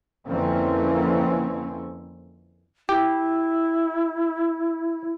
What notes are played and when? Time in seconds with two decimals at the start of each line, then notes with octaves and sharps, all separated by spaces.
0.26 F2 D3 E3 A#3 C4 C#4
2.89 E4 G4